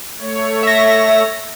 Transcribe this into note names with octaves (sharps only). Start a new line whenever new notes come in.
A3 C#5
E5 A#6